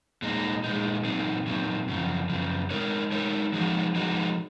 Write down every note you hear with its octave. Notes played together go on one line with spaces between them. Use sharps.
A#2 G#3 D#4
A#2 G#3 D#4
A#2 F#3 C4 D#4
A#2 F#3 C4 D#4
F#2 C#3 F3
F#2 C#3 F3
G#3 D#4 A#4 C#5
G#3 D#4 A#4 C#5
F3 G#3 D#4 F#4
F3 G#3 D#4 F#4